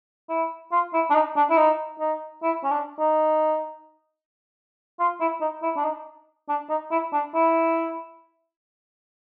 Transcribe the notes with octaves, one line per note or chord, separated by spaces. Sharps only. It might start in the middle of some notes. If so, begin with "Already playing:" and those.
E4
F4
E4
D4
D#4
D4
E4
D#4
D#4
E4
C#4
D4
D#4
F4
E4
D#4
E4
D4
D#4
D4
D#4
E4
D4
E4